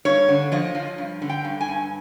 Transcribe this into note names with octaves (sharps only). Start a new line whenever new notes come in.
G2 C#5
D3
F3 D#5
F3
G2
D3
G5
G2
G#5
G2